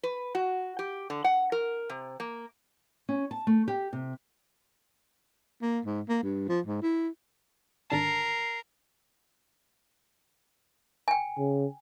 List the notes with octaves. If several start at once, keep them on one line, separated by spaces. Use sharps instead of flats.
B4
F#4
G4
D3
F#5
A#4
C3
A#3
C#4
A5
A3
G4
C3
A#3
G#2
A#3
G2
F3
G#2
E4
G#1 D3 A#4 A5 C7
G5 G#5
C#3